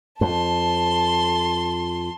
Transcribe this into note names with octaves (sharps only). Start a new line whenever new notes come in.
F2 A5 C6